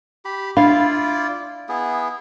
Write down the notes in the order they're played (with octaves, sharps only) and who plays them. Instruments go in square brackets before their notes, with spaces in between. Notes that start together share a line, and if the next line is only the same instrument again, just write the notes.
[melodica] G4 B5
[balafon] D4 [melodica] E4 F4 D5 [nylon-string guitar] F5
[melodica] B3 E4 G#4